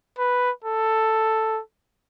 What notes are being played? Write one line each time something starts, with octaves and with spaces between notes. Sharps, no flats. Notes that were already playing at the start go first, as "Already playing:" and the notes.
B4
A4